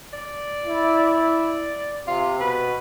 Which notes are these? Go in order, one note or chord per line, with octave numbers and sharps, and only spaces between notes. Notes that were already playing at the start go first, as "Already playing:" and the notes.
D5
E4
D5
C3 F4
B2 B4